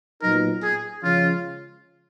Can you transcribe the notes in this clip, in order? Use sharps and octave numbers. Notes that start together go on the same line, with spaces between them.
A#2 F#3 B3 D#4 A#4
G#4
C#3 F3 G#3 C#4 F4